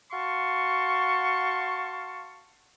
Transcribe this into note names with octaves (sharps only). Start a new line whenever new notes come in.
F#4 F5 A5 C6 C#6